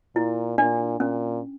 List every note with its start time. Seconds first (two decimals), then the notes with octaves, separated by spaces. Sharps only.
0.16 A#2 E4
0.58 A#2 D4
1.00 A#2 C#4